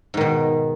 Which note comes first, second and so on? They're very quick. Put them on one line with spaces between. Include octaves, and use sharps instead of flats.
G#2 D#3 B2